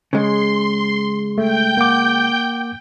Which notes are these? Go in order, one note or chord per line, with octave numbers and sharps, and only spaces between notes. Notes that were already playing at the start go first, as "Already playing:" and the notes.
C#3 G#3 C6
A3 G5 G6
A#3 F#5 D6